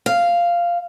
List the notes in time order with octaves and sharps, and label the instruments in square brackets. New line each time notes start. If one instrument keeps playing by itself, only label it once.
[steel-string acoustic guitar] F5